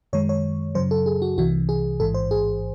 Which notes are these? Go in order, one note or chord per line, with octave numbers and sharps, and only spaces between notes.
F#2 D#3 G#3 C#5
C#5
F#2 C#3 F#3 C5
A4
G#4
F#4
C2 C3 E3 F#4
G#4
A1 G#2 E3 A4
C5
G#4